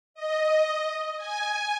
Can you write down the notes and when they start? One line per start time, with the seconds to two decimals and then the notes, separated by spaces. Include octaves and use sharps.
0.14 D#5
1.17 G#5